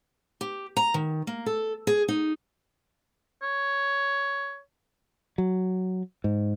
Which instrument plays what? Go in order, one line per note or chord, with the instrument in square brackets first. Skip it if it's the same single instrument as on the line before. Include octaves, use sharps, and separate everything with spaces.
[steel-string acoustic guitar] G4
A#5
D#3
A#3
A4
G#4
D#4
[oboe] C#5
[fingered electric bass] F#3
G#2